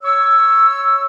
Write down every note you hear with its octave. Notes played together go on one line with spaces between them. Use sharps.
C#5 C#6 E6